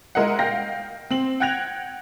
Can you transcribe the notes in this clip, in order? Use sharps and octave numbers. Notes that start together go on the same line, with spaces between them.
G#3 E4 A#4 D#5 F#5
F5 G5 G6 A#6
C4 F#7
F#5 G5 F#6 G#6 A#6 F7